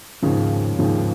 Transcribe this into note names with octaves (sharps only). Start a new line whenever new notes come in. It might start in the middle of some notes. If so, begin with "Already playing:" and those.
D#2 G#2 C#3 F3
D#2 G#2 C#3 F3